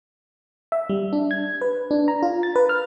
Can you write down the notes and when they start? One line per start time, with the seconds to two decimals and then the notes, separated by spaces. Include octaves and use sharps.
0.72 E5
0.89 G3
1.13 D4
1.31 G#6
1.61 B4
1.91 D4
2.08 A#5
2.23 F4
2.43 A6
2.56 B4
2.69 F6